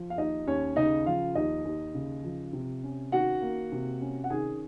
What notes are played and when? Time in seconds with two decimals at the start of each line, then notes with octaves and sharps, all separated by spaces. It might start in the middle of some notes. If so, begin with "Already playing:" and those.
Already playing: F3
0.10 F5
0.18 D#2 D#4 D#5
0.47 D#2 C#4 C#5
0.76 C#3 D#4 D#5
1.06 F3 F4 F5
1.35 D#2 D#4 D#5
1.65 D#2
1.95 C#3
2.24 F3
2.53 C3
2.83 C#4
3.12 D#3 F#4 F#5
3.42 A#3
3.72 C3
4.01 C#4
4.24 F#5
4.30 D#3 G#4 G#5